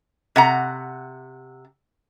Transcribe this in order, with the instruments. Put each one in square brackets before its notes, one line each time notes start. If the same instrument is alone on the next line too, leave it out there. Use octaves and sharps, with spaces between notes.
[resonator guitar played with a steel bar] C3 F#5 A#5